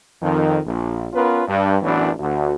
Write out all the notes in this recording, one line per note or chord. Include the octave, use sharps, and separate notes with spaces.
F2 D#3
A#1
B3 C#4 F4 A#4 B4
G2
A1 F#2 E3 F#3 B3 D4
D2 F#4